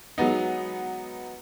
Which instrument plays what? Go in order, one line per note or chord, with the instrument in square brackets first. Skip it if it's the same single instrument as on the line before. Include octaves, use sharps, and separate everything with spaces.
[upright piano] F#3 G#3 B3 D#4